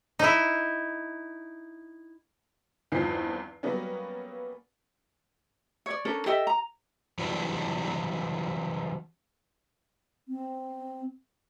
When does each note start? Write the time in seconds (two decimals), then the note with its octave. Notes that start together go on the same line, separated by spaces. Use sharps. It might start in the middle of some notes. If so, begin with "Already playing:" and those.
0.19 D#4 E4
2.92 E2 G2 D#3 F3 C4 C7
3.63 F#3 G3 A#3 B3 C#4
5.86 C#5 D5
6.05 C#4 D4 A4 A#4
6.26 G4 A4 D#5 E5
6.47 A#5
7.19 E3 F#3 G3 D4 F#4 D5
10.29 C4